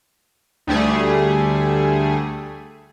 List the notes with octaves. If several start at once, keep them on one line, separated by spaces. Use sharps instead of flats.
D2 G3 A3 G#4